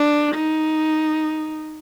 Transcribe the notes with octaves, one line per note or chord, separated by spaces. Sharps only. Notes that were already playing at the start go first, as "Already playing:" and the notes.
Already playing: D4
D#4